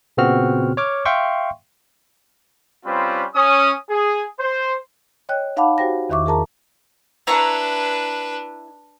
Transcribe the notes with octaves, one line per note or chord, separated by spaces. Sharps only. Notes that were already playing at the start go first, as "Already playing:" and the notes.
A#2 C#3 B3 C4 F#4 F6
C#5 D6 F6
E5 F5 G5 C6 C#6
G3 C4 C#4 F4 B4 C5
C#4 D#6
G#4
C5
C#5 D#5 G5 F#6
D#4 F5 F#5 A5 B5 D6
F#4 G4 C5 G5 A#6
E2 D#3 E5 C#6 D6
G#4 A#4 A5 A#5
D4 E4 B4 A#5 C#6